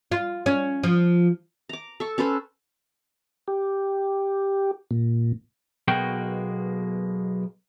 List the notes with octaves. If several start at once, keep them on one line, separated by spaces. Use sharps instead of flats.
F4
C#4
F3
A#5 D6
A4 C#6
C#4 A4 B4 C5
G4
A#2
B1 B2 G#3 A#3 F#4 G5